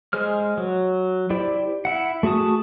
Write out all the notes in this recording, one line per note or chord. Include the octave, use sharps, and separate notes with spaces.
G#3 G#4 C5 F6
F#3
E4 G4 C5 D5
E4 F#5
A3 F#4 G#4 A5 D#6